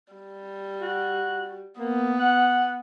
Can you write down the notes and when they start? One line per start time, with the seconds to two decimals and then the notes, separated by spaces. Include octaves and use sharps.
0.13 G3
0.81 F#4
1.79 A#3 B3
2.19 F#5